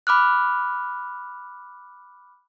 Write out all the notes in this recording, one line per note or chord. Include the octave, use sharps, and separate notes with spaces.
B5 D6 F6 F#6